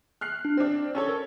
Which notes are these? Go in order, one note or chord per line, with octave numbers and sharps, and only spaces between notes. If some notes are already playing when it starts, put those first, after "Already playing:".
F6 F#6 C7
D4
C4 D4 C5
C#4 A4 C#5 C#6
A#4